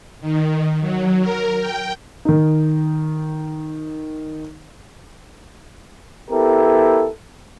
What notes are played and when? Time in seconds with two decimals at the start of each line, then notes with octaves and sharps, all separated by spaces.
0.21 D#3
0.80 F#3
1.21 A#4
1.60 G5
2.25 D#3 D#4
6.31 B3 E4 G4 A4 A#4